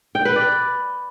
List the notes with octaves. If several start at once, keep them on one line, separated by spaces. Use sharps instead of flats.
G5
B4
D5